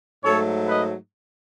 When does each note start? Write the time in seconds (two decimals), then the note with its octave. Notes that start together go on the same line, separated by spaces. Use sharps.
0.24 G#2 F#3 A3 A4 C#5
0.68 B4 D#5